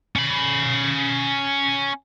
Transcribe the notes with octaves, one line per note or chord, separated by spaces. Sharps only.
C#4 B5